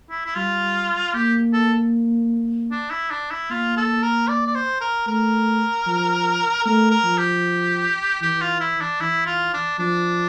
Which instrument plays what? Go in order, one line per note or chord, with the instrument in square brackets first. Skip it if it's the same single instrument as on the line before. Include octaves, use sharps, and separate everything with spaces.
[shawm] E4
E4
[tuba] G3 [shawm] F4
[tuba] A#3 [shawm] G4
[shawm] A4
D4
E4
D4
E4
[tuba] A#3 [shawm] F4
[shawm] A4
A#4
D5
D5
C5
A#4
[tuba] A3 [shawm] A#4
[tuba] F3
[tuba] A3 [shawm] A#4
[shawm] A#4
[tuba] F3
[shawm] G4
[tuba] E3 [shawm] G4
[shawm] F4
E4
D4
[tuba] E3 [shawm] E4
[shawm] F4
D4
[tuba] F3 [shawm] D4